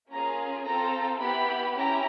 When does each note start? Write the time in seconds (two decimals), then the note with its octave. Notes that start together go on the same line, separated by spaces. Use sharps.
0.10 A#3 C#4 F4 G#4 A#5
0.66 C4 F4 A4 A#5
1.21 B3 E4 G4 B5
1.76 C#4 E4 G4 A#5